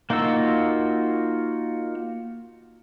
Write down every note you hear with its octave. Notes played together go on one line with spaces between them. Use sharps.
A#3 D#4 F4 F#4 E6